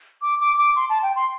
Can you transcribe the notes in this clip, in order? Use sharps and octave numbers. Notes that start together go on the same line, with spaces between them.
D6
D6
D6
C6
A5
G5
C6